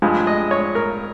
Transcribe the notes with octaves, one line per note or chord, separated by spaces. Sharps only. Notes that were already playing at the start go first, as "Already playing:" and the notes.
G2 F3 G#3
D#5
C#5
A#4